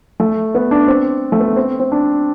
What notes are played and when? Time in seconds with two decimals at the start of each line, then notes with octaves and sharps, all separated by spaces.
0.20 A3
0.55 B3
0.71 D4
0.88 C4
1.32 A3
1.39 B3
1.56 C4
1.80 C4
1.92 D4